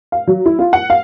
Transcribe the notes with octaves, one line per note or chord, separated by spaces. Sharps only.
F5
F#3
E4
F4
F#5
F5